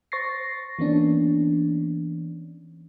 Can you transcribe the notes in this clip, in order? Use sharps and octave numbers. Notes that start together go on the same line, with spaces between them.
C5 C#6 A6 A#6 C7
E3 A#3 B3 C#4 D4